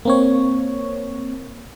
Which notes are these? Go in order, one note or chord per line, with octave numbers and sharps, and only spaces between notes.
A#3 C4 C#5